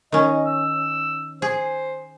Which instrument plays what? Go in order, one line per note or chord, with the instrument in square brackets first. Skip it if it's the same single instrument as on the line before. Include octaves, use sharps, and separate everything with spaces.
[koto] D#3 C#4 [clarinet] D#5
[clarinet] E6
[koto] G#4 [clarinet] C5